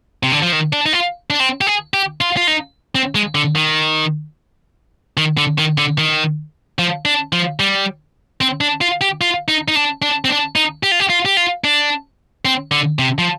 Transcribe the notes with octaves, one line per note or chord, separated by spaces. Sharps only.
C3
D3
F3
D#3
D4
D#4
F4
D4
C4
G4
G#4
G4
F4
F4
D#4
C4
G#3
D3
D#3
D#3
D3
D#3
D3
D#3
F3
D4
F3
G3
C4
D4
F4
G4
F4
D#4
D#4
D4
D4
C4
D4
D#4
G4
F4
G4
F4
G4
F4
D4
C4
D3
C3
F3